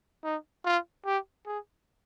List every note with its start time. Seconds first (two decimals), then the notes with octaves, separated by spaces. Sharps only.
0.24 D#4
0.65 F4
1.05 G4
1.46 G#4